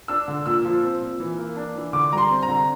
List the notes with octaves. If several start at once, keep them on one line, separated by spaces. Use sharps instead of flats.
D4 E6
D3
A#2 E6
F3
C4
A#2
E3
A#3
D4
E3
D3 D6
G3 A#5
C6
C4
A#5
D3